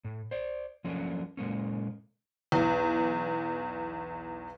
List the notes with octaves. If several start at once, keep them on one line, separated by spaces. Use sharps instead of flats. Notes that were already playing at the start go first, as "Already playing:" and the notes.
A2
C5 D5
F3 F#3 A3 A#3 C#4 D4
A#2 G#3 A#3 C#4
B1 E2